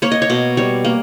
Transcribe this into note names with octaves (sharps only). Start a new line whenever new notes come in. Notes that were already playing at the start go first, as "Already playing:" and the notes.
A#3 C#5
D#5
C#5
B2
G3 C#5
A#3